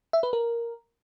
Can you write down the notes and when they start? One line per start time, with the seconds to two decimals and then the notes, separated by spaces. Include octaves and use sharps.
0.13 E5
0.23 B4
0.33 A#4